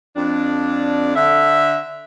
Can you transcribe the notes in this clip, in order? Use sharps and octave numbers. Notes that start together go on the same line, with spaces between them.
F2 D4
D3 E5